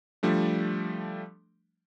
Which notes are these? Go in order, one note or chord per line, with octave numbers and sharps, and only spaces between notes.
F3 G3 A3 D4